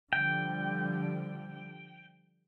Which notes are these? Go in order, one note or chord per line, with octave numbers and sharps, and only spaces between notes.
D3 F3 G3 G5